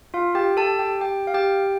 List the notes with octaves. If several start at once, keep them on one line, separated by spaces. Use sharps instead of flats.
F4 F5
G4 G5
A4 A5
G4 G5
G4 G5
F5
G4 G5